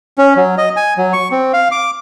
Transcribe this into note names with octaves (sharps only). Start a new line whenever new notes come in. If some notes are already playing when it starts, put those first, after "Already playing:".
C#4
F#3
D#5
G#5
F#3
C#6
C4
F5
D6